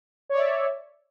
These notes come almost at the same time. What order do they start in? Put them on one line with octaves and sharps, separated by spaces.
C#5 D5 E5